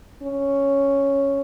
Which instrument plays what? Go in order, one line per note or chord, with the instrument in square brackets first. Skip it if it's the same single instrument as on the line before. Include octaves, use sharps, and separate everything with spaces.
[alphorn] C#4